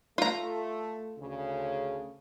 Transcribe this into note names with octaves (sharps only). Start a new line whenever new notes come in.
A3 F4 A#5
D2 C#3